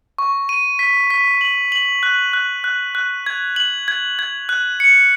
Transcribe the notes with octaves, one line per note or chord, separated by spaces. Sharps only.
C#6
D#7
B6
B6
F#7
F#7
F#6
F#6
F#6
F#6
G#6
F#7
G#6
G#6
F#6
C#7